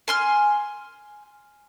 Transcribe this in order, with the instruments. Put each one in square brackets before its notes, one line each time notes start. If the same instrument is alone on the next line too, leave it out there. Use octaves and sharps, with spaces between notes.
[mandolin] G#5 C6 F6